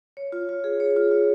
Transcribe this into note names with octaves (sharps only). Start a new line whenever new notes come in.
C#5
F4
F4
G#4
C#5
F4
F4